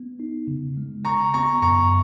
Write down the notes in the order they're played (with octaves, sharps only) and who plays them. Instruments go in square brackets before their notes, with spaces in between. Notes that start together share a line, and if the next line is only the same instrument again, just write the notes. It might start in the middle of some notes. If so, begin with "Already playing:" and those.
Already playing: [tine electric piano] B3
D#4
C#3
G#3
[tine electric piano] C#3 [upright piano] A#5 C#6
[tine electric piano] B3 [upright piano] A#5 C#6
[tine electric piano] F#2 [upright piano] A#5 C#6